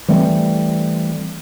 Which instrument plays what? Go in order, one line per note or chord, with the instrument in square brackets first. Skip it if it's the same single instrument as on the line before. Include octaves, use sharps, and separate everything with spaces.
[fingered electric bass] E3 G3 A3 C4